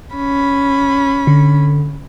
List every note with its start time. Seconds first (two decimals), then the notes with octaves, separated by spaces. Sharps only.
0.16 C#4 B5
1.27 D3